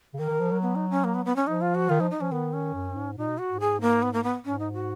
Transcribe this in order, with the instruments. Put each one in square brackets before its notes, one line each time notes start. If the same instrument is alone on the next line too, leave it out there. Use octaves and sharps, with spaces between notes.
[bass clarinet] C#3
[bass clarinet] D#3 [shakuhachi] A#4
[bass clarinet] D#3
F3
F#3
[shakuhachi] B3
D#4
C#4
A#3
B3
B3
C#4
[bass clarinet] F3 [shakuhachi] D#4
[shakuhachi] F4
F#4
[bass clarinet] D#3 [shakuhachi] F4
[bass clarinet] F3 [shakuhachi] D#4
[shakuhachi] D#4
[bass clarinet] F3 [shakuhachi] C#4
[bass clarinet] D#3 [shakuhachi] B3
[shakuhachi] C#4
[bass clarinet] F#2
G#2
[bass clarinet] A#2 [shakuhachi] D#4
[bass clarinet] B2
[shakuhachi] F#4
[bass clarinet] G#2
[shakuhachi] G#4
A#3
B3
A#3
B3
[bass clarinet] G#2 [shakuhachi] C#4
[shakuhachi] D#4
F#4